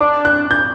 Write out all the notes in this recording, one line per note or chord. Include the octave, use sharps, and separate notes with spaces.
D4 D6
F#6
G6